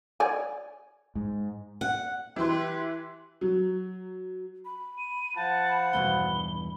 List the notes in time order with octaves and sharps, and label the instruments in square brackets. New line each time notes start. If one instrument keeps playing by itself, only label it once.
[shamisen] C#5 D5 G#5
[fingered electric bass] G#2
[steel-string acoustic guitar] F#5
[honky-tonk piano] E3 C6 [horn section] G4 B4
[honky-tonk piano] F#3
[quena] B5
[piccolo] D#7
[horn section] F3 F#5 [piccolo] A5
[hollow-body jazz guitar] E2 G2 B2 [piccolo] G7